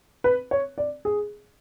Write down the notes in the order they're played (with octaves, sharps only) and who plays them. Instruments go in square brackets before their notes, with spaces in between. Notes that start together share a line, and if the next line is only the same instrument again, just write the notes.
[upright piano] B4
C#5
D5
G#4